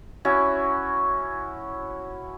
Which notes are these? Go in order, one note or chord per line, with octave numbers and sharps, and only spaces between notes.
C#4 E4 F#4